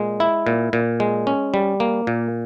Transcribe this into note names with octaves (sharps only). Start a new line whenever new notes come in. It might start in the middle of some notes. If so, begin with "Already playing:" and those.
Already playing: A#2 G#3
E4
A#2
A#2
G#3
C#4
G3
A#3
A#2